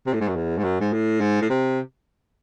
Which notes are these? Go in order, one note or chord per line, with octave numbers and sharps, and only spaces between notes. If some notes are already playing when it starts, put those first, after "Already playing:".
C3
A2
G#2
F#2
E2
G#2
F#2
G#2
A2
G#2
A2
C3